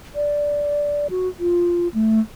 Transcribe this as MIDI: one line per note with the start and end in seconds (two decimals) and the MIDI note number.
0.15 1.07 74
1.10 1.28 66
1.39 1.88 65
1.94 2.20 57